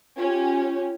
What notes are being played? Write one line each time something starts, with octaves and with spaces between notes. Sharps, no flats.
C#4 F4 G4